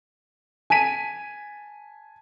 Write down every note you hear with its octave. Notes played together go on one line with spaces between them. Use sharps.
G#5 A5 B6 D#7